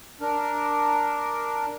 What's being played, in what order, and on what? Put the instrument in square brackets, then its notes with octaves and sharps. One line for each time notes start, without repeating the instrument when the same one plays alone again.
[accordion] D4 A#4